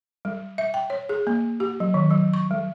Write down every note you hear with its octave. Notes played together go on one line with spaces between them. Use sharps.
G3
E5
G5
C#5
G#4
A#3
G4
F#3
D#3
F#3
C#6
G3